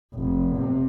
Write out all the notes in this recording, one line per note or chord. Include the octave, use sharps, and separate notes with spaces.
F1
C3